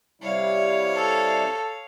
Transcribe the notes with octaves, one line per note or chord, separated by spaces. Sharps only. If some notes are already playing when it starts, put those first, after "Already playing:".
C3 G3 E4 C#5 F5
A4